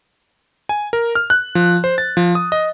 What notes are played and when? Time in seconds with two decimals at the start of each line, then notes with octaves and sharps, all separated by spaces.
0.69 G#5
0.93 A#4
1.15 F6
1.30 F#6
1.55 F3
1.84 C5
1.98 A6
2.17 F3
2.35 D#6
2.52 D#5